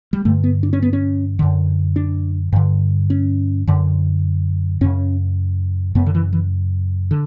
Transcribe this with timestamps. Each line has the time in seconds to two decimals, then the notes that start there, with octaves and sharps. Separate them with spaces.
0.13 G3
0.25 G2 D3 A3
0.44 B3
0.63 D4
0.73 C#4
0.82 B3
0.93 C#4
1.39 F#2 D3
1.96 D4
2.52 G2 D3
3.10 C#4
3.67 F#2 D3
4.81 F#2 C#3 C#4
5.95 F#2 C#3 B3
6.06 D3
6.15 E3
6.33 E3
7.11 D3